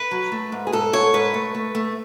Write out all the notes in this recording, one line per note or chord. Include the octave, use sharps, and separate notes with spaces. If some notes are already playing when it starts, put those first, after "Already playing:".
Already playing: B4
F#3
A3
G#2
G#4
G#2 A4
G#2 C#5
G#2 B4
A3
A3
A3